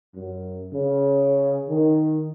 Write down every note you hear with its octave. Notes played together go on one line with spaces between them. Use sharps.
F#2
C#3
D#3